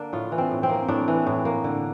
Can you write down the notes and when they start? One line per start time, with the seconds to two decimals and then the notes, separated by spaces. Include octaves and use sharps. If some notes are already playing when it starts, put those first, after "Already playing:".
Already playing: D3 A#3 D4
0.13 A2 F4
0.32 E3
0.38 C4
0.51 A2
0.63 C4
0.69 A#3
0.88 A2 D4
1.08 E3
1.26 A2
1.45 A#3
1.64 D3